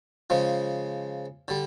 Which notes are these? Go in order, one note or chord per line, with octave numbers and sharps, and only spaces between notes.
C#3 F3 G#3
D3 G3